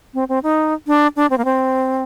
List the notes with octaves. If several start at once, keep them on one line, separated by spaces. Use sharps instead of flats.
C4
C4
D#4
D4
D4
C4
A#3
C4